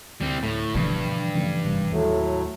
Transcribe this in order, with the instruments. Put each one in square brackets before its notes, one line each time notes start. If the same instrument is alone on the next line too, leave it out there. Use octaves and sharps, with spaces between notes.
[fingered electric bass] D2 [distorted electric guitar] G3 C4
[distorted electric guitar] A2
[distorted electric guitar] G2 [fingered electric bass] B2 D3 F3 [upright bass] E3
[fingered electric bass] C#3 F3 A3
G#1 C3 G3
[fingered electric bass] D#2 [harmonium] A2 F#3 A3